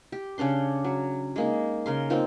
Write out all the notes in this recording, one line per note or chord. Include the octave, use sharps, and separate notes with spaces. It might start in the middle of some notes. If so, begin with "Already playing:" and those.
G4
C#3 C#4 D4 C6
F#3
G#3 A#3 D#4
C#3 A#4 C6
A#3 C4 D#4 F4